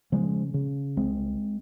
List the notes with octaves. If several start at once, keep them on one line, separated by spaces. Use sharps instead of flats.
C#3 F3 G#3
C#3
C2 G#3 C4